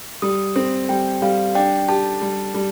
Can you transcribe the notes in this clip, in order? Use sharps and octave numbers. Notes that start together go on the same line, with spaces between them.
G3 D#6
C4
G3 G5
G3 F5
D4 G5
G4 A5
G3
G3